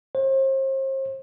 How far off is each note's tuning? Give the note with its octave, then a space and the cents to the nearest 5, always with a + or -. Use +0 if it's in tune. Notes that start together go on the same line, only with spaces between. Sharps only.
C5 +40